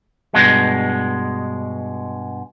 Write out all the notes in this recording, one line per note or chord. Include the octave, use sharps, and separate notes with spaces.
G2 B2 G#3